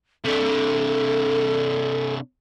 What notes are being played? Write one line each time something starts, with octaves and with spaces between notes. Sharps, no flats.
C3 D4 A4